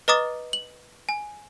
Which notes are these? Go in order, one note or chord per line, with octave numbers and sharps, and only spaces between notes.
B4 D#5 A#5 D6 D#6 A6
F#7
G#5